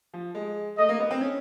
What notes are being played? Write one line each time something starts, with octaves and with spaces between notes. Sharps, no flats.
F3
G#3
A3 D#5
A#3
B3
C4
C#4